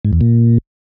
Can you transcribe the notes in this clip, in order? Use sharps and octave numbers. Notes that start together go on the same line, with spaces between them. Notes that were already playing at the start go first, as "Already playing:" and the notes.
G#2
E2
A#2